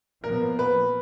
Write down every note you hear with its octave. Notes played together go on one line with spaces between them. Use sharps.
A#2 F3 B3 A#4
B4